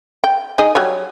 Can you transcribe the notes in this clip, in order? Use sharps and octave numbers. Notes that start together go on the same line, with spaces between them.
G5
D#4 G#4 D#5
F#3 G3 C#5